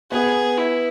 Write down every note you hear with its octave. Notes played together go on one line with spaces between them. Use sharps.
B3 G#4
E4